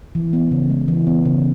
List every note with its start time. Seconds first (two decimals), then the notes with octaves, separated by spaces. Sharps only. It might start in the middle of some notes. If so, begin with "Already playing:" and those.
0.15 E3
0.33 B3
0.51 C#3
0.70 G#3
0.88 E3
1.07 B3
1.25 C#3